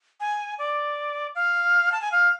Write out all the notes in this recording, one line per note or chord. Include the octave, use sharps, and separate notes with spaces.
G#5
D5
F5
A5
G#5
F5